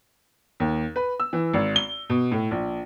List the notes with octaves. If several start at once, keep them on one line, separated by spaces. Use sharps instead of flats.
D#2
B4
E6
E3
G#1
G7
B2
A2
A#1